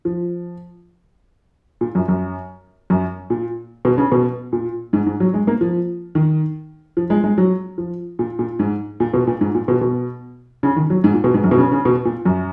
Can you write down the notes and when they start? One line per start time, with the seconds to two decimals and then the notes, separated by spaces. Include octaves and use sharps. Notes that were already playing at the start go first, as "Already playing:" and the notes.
0.05 F3
1.81 A#2
1.95 F#2
2.08 F#2
2.90 F#2
3.30 A#2
3.85 B2
3.98 C#3
4.12 B2
4.53 A#2
4.93 G#2
5.06 G#2
5.20 F#3
5.34 G#3
5.47 A#3
5.61 F3
6.15 D#3
6.97 F3
7.10 G#3
7.24 G#3
7.38 F#3
7.78 F3
8.19 A#2
8.39 A#2
8.59 G#2
9.00 A#2
9.14 B2
9.27 A#2
9.41 G#2
9.55 A#2
9.68 B2
9.81 B2
10.63 C#3
10.76 D#3
10.90 F#3
11.04 G#2
11.14 A#2
11.24 B2
11.34 G#2
11.44 F#2
11.51 B2
11.58 C#3
11.72 C#3
11.85 B2
12.05 A#2
12.25 F#2